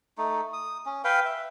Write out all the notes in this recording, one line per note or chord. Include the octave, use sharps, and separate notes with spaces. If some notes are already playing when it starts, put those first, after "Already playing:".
A3 D#4
D#6
C#4
B4 F5 G5
E5